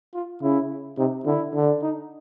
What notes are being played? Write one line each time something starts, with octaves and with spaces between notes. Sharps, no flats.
F4
C#3 E4
C3 D#4
D3 E4
D3
D#4